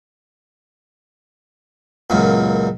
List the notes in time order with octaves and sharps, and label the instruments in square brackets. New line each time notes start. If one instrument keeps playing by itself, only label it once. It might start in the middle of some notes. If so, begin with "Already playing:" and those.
[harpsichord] C#2 F#2 A#2